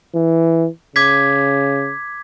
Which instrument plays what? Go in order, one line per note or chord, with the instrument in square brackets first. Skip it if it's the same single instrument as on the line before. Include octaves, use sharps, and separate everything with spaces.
[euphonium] E3
[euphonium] C#3 [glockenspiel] D6 G#6 B6